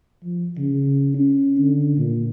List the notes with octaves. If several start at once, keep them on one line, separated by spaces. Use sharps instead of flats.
F3
C#3
C#4
D3
A#2